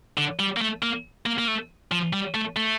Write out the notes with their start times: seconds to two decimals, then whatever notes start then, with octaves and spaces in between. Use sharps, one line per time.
0.18 D3
0.39 G3
0.57 A#3
0.61 A3
0.83 A#3
1.26 A#3
1.38 A#3
1.48 A3
1.92 F3
2.13 G3
2.34 A3
2.56 A3